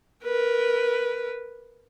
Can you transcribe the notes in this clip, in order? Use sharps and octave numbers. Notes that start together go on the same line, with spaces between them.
A#4 B4